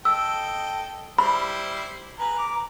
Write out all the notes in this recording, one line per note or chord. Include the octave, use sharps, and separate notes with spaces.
A4 D#5 G5 E6
G3 E4 C5 B5
G#4 B4 A#5
D6